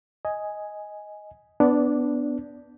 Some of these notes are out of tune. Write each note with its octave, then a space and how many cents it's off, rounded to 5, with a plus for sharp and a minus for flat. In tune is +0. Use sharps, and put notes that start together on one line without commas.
D#5 +10 G#5 +0
B3 +5 D4 +0 D5 -20